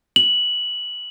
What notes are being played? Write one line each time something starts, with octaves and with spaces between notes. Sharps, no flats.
F#7